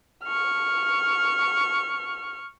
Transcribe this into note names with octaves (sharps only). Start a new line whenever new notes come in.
C#6 F6